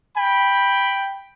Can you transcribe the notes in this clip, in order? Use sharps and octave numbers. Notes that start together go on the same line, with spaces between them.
G5 B5